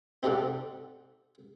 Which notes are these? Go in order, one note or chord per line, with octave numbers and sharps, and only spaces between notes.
C4 D#4 G4 A4 D5 F#5